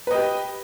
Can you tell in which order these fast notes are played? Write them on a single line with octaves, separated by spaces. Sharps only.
B4 D#5 G4